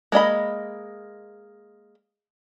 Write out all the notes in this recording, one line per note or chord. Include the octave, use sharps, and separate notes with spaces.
G#3 A#3 D#5 B5